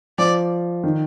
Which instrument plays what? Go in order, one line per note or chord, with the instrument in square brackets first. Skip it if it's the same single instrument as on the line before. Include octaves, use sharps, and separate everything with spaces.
[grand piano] F3 [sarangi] D5
[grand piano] D#3